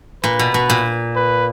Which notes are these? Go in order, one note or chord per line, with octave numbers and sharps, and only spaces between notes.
A#2 B4
B2
B2
A#2
B4